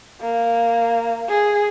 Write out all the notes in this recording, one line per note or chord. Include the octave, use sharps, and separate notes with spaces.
A#3
G#4